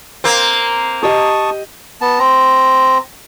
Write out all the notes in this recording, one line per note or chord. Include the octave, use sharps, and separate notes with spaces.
A#3 C4
G4 D#5 A5 C#6 D#6
B3 A5
C4 A#5